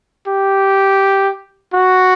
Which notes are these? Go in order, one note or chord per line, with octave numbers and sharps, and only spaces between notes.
G4
F#4